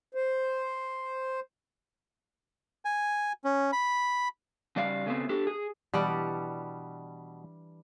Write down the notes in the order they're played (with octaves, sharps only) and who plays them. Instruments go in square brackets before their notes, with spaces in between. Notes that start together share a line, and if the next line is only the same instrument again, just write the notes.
[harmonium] C5
[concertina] G#5
C#4
B5
[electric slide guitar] C#3 G3 D5 F5
C#3 A3 B3 C4
D4 G4 A4
G#4
[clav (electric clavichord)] B2 [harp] E3 D4 [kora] G3 G4 F#5